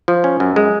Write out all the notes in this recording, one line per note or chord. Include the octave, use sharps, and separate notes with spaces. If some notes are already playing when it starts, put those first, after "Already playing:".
F3
C#4
F#2
G#3